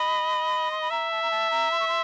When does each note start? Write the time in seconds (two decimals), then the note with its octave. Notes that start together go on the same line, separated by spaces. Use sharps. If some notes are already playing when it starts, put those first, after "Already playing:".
Already playing: D#5 B5
0.71 C6
0.81 B5
0.91 E5 A#5
1.11 A5
1.22 A#5
1.31 A5
1.51 A#5
1.71 C6
1.80 C#6
1.88 C6